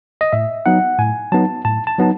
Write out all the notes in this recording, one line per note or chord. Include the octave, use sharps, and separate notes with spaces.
D#5
A2 E5
F#3 B3 D#4 F#5
A2 G#5
F#3 B3 D#4 A5
A2 A5
A5
F#3 B3 D#4 A5